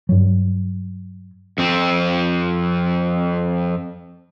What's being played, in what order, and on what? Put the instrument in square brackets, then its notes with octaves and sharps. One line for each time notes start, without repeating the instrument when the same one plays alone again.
[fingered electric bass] G2 F#3
[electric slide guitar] F2 C4